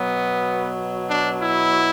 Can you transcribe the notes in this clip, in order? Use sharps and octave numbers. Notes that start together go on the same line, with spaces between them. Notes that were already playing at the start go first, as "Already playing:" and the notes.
Already playing: B2 F#3 B3
D4
E4